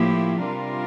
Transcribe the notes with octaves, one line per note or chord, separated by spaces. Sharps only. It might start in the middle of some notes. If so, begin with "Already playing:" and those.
Already playing: A2 F3 A#3 E4 G4
C3 G3 D4 F4 A#4